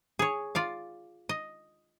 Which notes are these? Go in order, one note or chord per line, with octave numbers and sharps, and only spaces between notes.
G#4 C#5
F4 D5 F5
D#5